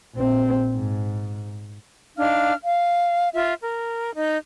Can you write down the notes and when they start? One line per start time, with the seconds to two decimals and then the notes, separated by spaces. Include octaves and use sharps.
0.15 A#1 C4
0.75 G#2
2.17 D4 D#4 F5 F6
2.64 F5
3.33 F4 E5
3.59 A#4
4.13 D#4